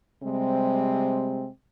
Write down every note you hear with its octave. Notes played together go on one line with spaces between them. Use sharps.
C3 G3 G#3 C4